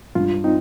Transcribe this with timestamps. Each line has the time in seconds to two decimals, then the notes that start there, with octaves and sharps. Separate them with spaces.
0.15 G2 F4
0.44 C4 D#4